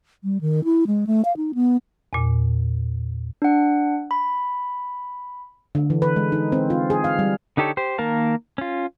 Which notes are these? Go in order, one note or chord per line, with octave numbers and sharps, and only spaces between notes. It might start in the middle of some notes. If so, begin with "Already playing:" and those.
G3
D#3
E4
G#3
A3
F5
D#4
B3
E2 A#2
D4 F#5
B5
D3
E3
B4
G#3
D#4
C4
F4
G#4
F5
G3
D3 D#4 G4 A4 C#5
G4 C5
D#3 A#3 A#4 F5 A5
C#4 F4